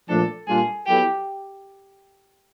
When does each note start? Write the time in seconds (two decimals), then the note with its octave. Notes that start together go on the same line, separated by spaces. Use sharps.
0.08 A#2 F3 A3 D4 A4
0.47 A#2 G3 A#3 D4 F4 G#4
0.86 F#3 B3 E4 G4 A4